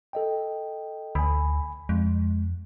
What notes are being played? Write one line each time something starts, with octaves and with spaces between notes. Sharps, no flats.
A4 D#5 G5
D2 G#5 B5
F2 G#3